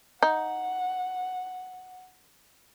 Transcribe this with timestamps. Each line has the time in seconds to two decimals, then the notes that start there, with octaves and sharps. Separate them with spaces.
0.23 D#4 F#5